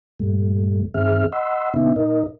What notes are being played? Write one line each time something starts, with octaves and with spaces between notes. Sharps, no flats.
G2 A#2 G3 A3
G2 D#3 C4 G#4 E5 F6
D#5 F#5 B5 C6 E6
A#2 C#3 B3 D4 D#4 E5
A#2 D#4 A#4 D#5